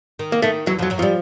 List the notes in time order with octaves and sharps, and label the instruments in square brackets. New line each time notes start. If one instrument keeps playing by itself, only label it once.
[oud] D#3
[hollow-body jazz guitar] A#3
[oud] D#3 [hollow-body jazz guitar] A3
[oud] E2 E3 [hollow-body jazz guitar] F#3
[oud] F2 F3 [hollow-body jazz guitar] F#3
[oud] F#2 F#3
[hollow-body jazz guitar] F3 [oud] G3